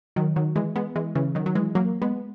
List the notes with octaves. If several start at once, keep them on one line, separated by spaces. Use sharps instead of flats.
D#3 F#3
D#3 F#3
E3 G#3
G#3 B3
E3 G#3
C#3 E3
D#3 F#3
F#3
E3 G#3
F#3 A#3
G#3 B3